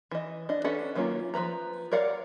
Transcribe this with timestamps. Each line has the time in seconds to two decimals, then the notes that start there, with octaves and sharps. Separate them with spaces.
0.11 E3 D#5
0.49 D4 D#5
0.64 C#4 D4 A4 B4 F#5
0.95 D#3 F#3 A#3 C#4 F4
1.34 F3 A#3 B4 A#5
1.92 A#4 C#5 D5 F5 F#5